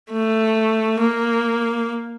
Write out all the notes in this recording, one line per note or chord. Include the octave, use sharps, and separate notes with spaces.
A3
A#3